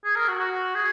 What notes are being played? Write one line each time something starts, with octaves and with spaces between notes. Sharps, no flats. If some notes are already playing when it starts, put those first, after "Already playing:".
G#4
A#4
F#4
F#4
G#4